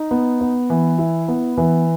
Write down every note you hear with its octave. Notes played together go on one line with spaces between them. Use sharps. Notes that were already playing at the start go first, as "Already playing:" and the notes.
Already playing: D#4
B3
B3
E3
E4
B3
E3